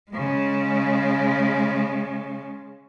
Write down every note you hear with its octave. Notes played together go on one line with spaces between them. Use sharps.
C#3 G#3